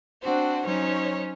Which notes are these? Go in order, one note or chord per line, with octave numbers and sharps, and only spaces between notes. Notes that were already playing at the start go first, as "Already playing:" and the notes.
C4 D4 F#4 C5
F#3 C#4 D#4 C5 C#5